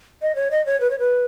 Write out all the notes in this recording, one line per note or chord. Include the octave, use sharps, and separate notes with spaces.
D#5
C#5
D#5
C#5
B4
C#5
B4